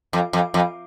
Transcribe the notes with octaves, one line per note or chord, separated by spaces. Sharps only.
F2
F2
F2